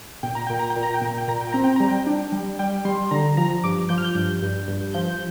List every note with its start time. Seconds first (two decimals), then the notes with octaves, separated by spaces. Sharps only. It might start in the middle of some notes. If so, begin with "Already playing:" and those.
0.23 A#2 G5
0.35 A#5
0.47 A#2 G5
0.59 A#5
0.70 G5
0.76 A#2
0.83 A#5
0.94 G5
1.01 A#2 A#5
1.18 G5
1.28 A#2 A#5
1.41 G5
1.52 C4 A#5
1.64 G5
1.76 G3 A#5
1.89 G5
2.07 D4
2.32 G3
2.59 G3 G5
2.85 G3 C6
3.11 D3 A#5
3.37 F3 A#5
3.64 G2 D6
3.89 F3 G6
3.98 F6
4.04 G6
4.15 G2 G6
4.42 G2
4.68 G2
4.94 F3 G6